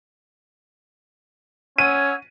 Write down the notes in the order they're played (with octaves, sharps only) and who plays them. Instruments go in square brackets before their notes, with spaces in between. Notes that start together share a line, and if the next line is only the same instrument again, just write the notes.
[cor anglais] C#4 [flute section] F#5 E6 G#6 [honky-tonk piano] D#7